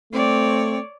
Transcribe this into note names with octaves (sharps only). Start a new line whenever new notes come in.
A3 C4 C#5 D5